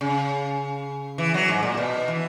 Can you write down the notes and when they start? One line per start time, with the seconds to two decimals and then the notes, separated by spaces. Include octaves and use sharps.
0.01 C#3
1.18 E3
1.34 F#3
1.48 G#2
1.63 A#2
1.77 B2
2.08 E3